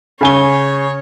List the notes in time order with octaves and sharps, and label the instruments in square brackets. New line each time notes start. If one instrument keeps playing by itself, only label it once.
[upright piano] C#3 G#5 G7 [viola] C#5